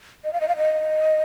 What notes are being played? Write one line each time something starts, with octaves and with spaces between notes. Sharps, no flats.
D#5
F5
D#5
F5
D#5